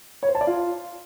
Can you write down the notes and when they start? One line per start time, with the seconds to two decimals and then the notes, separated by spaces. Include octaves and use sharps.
0.23 C#5
0.29 C5
0.35 A5
0.41 D5
0.47 F4